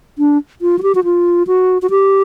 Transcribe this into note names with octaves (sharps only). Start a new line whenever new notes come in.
D4
F4
F#4
G4
F#4
F4
F#4
F#4
G4